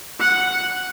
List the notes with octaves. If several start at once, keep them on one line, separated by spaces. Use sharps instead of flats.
F#5